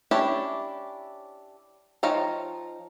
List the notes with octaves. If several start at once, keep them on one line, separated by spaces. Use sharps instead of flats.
C#4 D4 E4 G4 C#5
F3 D#4 C#5 F5 G5